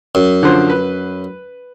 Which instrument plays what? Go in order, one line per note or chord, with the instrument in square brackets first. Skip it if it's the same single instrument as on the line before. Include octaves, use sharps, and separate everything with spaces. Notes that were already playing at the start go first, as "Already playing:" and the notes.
[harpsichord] F#2
[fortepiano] D3 F3 C5
B4